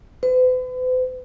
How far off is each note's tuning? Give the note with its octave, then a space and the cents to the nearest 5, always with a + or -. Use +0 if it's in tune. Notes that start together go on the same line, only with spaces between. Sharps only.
B4 +45